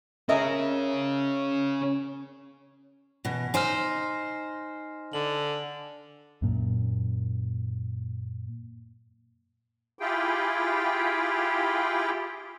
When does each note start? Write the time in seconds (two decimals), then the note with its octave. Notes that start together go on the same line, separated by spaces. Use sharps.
0.29 C#4 G#4 A#4 D#5 E5
3.25 B2 E3
3.54 D#4 C5 D#5 G#5 F6
5.13 D3 F#7
6.42 F#2 A#2
9.99 E4 F4 G4 G#4 G5